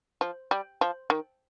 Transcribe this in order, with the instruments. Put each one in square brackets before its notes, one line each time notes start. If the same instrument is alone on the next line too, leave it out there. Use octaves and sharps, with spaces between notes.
[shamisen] F3
G3
F3
D#3